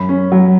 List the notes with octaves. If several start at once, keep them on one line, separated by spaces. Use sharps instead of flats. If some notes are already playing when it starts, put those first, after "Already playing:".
Already playing: F#2 B5
C#4
F#3